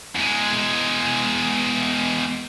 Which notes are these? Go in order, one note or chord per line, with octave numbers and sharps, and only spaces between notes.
E2 G#3